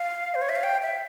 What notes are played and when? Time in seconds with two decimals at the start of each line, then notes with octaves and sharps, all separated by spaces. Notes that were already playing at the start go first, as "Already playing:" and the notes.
Already playing: F5
0.35 C5
0.42 C#5
0.49 E5
0.56 F5
0.63 G5
0.82 E5